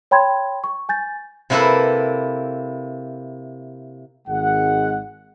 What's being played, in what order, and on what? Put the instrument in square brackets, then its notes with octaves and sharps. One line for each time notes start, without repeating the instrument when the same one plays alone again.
[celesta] C#5 G5 B5 C6 G#6
C#6
G#5 G6 A6
[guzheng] C3 A#3 E4 A4 B4
[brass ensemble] G#1 G#3 F#5